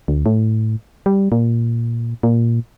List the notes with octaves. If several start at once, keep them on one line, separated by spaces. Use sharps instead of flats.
D2
A2
G3
A#2
A#2